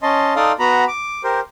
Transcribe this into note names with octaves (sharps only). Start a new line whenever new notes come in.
C#4 D#5 A5 C6
D#4 A4 D5 F5 C6 D#6
B3 F#4 A#5 B5
D6
G4 A#4 C5